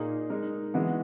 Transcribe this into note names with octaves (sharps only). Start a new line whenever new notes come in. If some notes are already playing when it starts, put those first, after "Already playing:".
Already playing: A#2 A#3 D#4 G#4
G#3 D#4 A#4
E3 G#3 B3 F#4